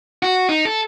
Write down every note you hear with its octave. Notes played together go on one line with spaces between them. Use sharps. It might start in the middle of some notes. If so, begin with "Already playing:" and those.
F#4
D#4
A4